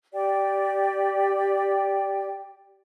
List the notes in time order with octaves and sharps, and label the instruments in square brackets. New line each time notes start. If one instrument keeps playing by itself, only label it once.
[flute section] G4 D5 G5